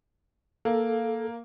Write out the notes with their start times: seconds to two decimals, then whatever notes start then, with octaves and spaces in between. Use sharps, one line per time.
0.65 A#3 A4